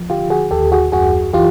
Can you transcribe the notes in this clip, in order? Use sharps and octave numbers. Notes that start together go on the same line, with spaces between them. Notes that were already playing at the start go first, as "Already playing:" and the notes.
Already playing: F3
D3 F4 G4
F#4 G#4
D#2 G4 A4
F#4 G#4
F#2 F#4 G#4
E3 F4 G4